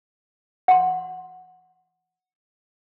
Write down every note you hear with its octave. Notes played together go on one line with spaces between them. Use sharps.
F#5 C6